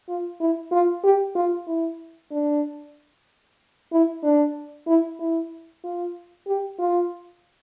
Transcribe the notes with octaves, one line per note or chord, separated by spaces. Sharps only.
F4
E4
F4
G4
F4
E4
D4
E4
D4
E4
E4
F4
G4
F4